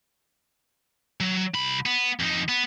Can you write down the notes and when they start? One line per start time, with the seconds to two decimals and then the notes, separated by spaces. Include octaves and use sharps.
1.20 F#3
1.54 C2 B5
1.86 B3
2.20 F2 D#4
2.49 B3